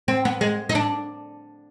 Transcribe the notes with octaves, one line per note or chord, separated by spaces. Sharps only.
C4
B3
G#3
D#4
D4